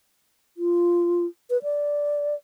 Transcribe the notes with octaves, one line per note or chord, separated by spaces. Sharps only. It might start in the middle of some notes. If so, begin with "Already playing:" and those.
F4
B4
D5